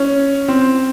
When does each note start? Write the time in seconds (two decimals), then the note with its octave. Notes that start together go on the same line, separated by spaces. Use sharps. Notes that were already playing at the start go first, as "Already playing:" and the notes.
Already playing: C#4
0.48 C4